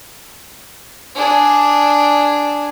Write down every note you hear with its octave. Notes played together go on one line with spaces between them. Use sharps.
D4 G#4